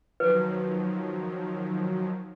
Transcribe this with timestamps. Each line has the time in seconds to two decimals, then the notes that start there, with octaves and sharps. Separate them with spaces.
0.20 D#3 F3 F#3 B4